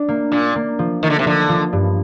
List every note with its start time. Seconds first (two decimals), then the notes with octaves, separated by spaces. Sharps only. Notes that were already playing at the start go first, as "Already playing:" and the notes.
Already playing: D4
0.08 A#3
0.32 A#2 D4
0.56 A#3
0.79 F3
1.03 D#3 A#3
1.10 D3
1.19 C3
1.26 D3 F3
1.49 F3
1.73 G2